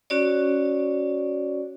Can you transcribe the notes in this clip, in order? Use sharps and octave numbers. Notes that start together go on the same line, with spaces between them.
C#4 F#4 C#5 D5